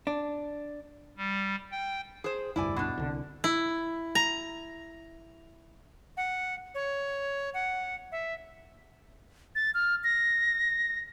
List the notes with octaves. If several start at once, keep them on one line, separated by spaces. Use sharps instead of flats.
D4
G3
G5
G#4 C5
F1 D2 G2 E4 D5 G#5
B2 D4
C2 D3
E4
A#5
F#5
C#5
F#5
E5
A6
F6
A#6